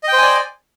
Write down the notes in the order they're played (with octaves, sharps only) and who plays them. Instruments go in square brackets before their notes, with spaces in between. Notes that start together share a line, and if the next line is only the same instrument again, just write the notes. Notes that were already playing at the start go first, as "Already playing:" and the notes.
[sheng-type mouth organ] D#5
G5
C5
G#5
D5